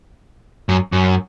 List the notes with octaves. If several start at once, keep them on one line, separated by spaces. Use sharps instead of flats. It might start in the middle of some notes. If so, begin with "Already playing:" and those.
F#2
F#2